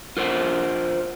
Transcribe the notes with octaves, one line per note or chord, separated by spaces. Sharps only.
F4 A#4 C5 F#5